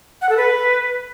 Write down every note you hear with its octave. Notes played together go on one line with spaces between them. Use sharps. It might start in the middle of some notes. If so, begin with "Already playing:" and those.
F#5
A4
B4